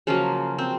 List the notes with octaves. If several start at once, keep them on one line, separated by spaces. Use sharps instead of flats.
C#3 F3 F#3 A#3 F4
C4